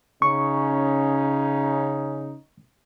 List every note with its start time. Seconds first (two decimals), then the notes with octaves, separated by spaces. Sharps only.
0.22 C#3 C#4 D#4 C#6